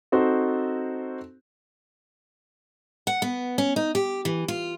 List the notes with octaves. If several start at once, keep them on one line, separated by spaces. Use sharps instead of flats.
C4 D#4 F#4 A4 C5
F#5
B3
C#4
D#4
G4
E3
F4